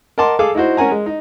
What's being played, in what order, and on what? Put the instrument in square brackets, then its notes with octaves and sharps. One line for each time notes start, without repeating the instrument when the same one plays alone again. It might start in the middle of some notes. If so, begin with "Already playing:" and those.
[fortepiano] A#4 D#5 F#5 A5 C6 D6
G#4 A4 F5 D6 E6
D#4 E4 F#4 C5
C#4 A#4 F#5 G#5 A#5
G#3
D#4